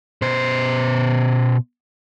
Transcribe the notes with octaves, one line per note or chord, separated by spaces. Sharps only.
B2 C5